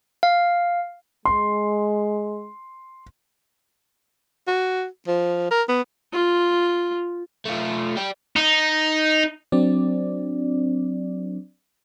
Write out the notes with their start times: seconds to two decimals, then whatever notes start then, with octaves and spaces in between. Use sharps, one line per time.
0.23 F5
1.25 G#3 C6
4.48 F#4
5.08 F3
5.51 A#4
5.69 B3
6.13 F4
7.45 A3 F4
7.97 D5 G5
8.36 D#4
9.52 F#3 C4 D4 D5